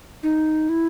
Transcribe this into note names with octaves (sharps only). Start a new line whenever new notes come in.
D#4
E4